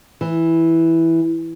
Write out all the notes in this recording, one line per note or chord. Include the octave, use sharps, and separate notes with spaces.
E3